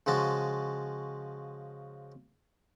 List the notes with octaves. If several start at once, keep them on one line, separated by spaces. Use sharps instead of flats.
C#3 F3 G#3 F#4 A5